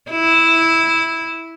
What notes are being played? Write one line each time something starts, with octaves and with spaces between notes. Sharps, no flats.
E4